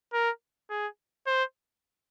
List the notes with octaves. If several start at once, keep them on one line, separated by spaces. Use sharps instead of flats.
A#4
G#4
C5